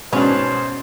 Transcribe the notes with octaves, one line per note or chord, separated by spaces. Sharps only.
G#2 B2 C#4 D4 B4 C5